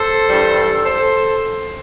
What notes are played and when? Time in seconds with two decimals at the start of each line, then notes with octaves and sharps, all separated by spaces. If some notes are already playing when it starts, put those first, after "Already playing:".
Already playing: A4 C5
0.28 G2 E3 G3
0.86 A4 C5